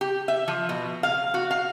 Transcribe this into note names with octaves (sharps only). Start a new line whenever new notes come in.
G4
E5
F3
B2
F5
F#4
F5